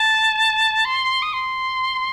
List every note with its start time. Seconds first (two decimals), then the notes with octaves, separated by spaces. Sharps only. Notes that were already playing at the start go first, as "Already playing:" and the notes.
Already playing: A5
0.85 C6
1.22 D#6
1.33 C6